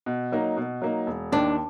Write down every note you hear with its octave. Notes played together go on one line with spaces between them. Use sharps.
B2
F#3 A#3 D#4
B2
F#3 A#3 D#4
E1
D#2 D#3 D4